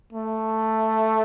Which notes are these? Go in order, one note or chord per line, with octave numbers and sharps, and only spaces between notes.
A3